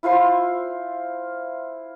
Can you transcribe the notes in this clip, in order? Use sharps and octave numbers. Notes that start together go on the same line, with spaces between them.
E4 F4 C5 C6